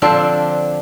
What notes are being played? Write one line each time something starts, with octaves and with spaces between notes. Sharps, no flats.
D3 F3 C4 D4